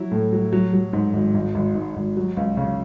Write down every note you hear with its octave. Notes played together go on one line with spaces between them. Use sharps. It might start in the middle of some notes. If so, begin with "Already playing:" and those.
Already playing: F#3 E4
A2
F#3
F#3
F#3
G#2
G#1
G#1
G#1
G#2
G#1
F#3
C#2
C#3